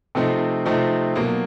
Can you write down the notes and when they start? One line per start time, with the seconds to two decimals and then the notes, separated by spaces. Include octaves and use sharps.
0.15 C3 F3 A3 C4 D#4
0.66 C3 F3 A3 C4 D#4
1.15 B2 F#3 A#3